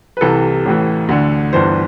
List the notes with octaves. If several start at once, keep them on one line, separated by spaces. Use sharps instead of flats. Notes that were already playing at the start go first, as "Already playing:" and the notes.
B4
C2 C3 E3 A4
A1 A2 E3
D2 D3
G1 G2 E3 C5